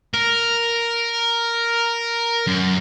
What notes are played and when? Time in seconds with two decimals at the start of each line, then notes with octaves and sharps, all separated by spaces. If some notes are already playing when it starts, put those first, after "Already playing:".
0.13 A#4
2.47 F#2